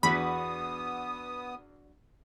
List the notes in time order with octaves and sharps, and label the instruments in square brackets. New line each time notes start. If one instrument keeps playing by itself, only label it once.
[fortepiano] E2 [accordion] B3 D#6 [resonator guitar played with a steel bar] D4 F#4 B4 [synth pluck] B5